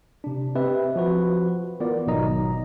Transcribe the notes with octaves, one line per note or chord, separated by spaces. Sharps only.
C3 D4
C4 G4 B4 D#5 E5
F3 F#4 B4
E3 B3 F4 A#4 D5
G#1 B2 F#3 D#4 D#5 A#5